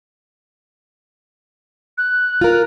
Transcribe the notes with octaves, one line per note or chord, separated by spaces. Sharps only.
F#6
F4 A#4